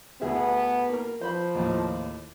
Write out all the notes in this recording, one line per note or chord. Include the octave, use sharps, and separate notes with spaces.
D2 B3 G#4 E5
A#3 A#4
F3 C5 B5
D#2 A2